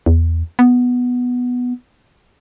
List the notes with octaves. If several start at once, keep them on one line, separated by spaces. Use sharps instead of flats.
E2
B3